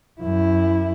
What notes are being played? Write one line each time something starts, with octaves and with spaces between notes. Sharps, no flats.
F#2 E4